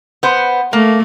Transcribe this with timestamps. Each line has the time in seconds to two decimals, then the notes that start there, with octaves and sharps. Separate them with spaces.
0.23 B3 C5
0.73 A3 A#3